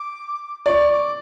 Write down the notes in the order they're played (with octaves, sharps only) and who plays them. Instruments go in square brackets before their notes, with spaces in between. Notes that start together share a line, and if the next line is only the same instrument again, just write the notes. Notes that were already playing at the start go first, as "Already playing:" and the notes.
Already playing: [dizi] D6
[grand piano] D5 [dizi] C#6
[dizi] D6